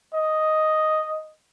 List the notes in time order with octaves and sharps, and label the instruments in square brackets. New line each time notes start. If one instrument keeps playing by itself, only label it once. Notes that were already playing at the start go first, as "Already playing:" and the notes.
[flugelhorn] D#5